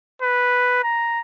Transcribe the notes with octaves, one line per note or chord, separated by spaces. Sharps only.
B4
A#5